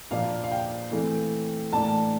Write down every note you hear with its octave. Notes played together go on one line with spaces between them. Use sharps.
A#2 F3 A#3 D4 F5
F5
G5
E3 A3 C4
A2 E3 A#3 D4 A5